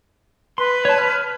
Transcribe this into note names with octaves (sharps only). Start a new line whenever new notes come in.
B4 C6
C#5 A5
F6